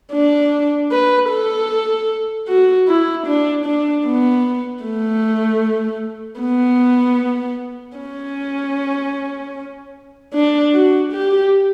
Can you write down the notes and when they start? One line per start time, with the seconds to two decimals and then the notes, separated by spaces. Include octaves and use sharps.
0.12 D4
0.91 B4
1.30 A4
2.48 F#4
2.88 E4
3.26 D4
3.66 D4
4.06 B3
4.84 A3
6.40 B3
7.97 C#4
10.34 D4
10.73 F#4
11.12 G4